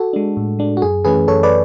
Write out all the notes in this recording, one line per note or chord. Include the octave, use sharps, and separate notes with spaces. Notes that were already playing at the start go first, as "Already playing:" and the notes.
Already playing: F#4 A4
G#3 D4
A2
G#3 D4
F#4
F#2 G#4
E3 A3 C#4 G#4 B4
F#2 A4 C#5
B4 D5